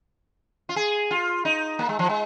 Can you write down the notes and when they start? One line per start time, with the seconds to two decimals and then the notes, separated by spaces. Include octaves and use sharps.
0.69 F4
0.76 G#4
1.11 F4
1.45 D#4
1.79 A#3
1.89 G#3
1.99 F3
2.09 G#3